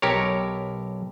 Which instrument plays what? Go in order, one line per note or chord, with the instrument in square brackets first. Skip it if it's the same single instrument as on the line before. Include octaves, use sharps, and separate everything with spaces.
[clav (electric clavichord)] B1 G4 A#4 C#5